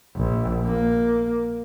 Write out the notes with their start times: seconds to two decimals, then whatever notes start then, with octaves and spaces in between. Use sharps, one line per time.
0.15 A#1
0.66 A#3